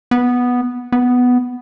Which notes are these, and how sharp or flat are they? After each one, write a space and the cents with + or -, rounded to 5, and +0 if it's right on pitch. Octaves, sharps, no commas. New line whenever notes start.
B3 -5
B3 +5